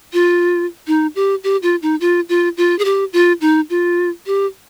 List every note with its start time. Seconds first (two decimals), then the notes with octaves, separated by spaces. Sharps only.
0.13 F4
0.87 D#4
1.15 G4
1.44 G4
1.63 F4
1.82 D#4
2.01 F4
2.29 F4
2.57 F4
2.79 G#4
2.85 G4
3.13 F4
3.41 D#4
3.70 F4
4.26 G4